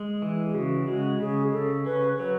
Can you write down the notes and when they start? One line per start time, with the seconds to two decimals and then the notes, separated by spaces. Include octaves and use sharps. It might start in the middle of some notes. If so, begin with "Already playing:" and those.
Already playing: G#3
0.22 E3
0.44 G#4
0.55 C#3 F#4
0.88 G#3 F#4
1.20 C#3 G#4
1.53 C#3 A4
1.86 C#4 B4
2.19 F#3 B4